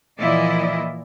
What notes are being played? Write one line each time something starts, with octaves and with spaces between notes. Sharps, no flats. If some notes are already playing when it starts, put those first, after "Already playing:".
A#2 E3 F3 E4 D5 D#5